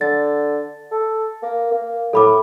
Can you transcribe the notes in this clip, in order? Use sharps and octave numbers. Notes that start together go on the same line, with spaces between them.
D3 A6
A4
A#3
A#3
A2 A4 B5 D6